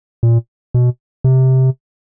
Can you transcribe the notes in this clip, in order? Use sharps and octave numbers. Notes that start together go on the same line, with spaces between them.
A#2
B2
C3